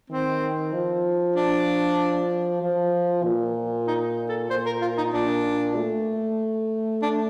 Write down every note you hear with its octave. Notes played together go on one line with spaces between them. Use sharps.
D#3 C4
F3
D4
F3
A#2
D#4
A4
A#2 C5
A#4
F4
D#4
A#2 D4
A3
D4